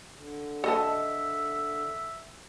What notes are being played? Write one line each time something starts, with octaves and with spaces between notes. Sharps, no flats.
D3
A4 D#5 E5 A5